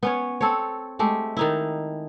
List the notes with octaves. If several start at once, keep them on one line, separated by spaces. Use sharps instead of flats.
B3 C#4 C#5
C4 A4 C#5
G#3 A3 G4
D#3 D#4 E4